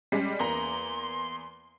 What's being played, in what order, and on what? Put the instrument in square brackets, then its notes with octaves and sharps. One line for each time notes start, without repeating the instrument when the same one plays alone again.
[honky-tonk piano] G3 G#3 C#4
[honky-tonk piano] E2 A#3 A#5 [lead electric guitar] C6